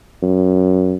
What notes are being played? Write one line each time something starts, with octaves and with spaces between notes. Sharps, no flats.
F#2